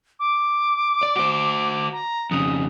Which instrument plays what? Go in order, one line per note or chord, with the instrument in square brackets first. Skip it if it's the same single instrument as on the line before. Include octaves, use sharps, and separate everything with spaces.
[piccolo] D6
[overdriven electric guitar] D5
F#4 C5
[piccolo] A#5
[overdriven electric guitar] F2 C#3 [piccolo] D#6